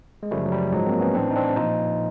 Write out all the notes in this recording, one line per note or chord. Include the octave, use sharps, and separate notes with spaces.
G#3
F#2 C#3 F3 G3 A3
F#3
G3
G#2 F3 F#3 G#3
A#3 C4
B3 C#4
A2 E3 C4 D4
D#4
C4 D4
A#2 F3 D#4 F4